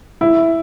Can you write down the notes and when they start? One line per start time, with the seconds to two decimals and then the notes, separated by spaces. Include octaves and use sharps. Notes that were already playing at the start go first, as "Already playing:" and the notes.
0.21 E4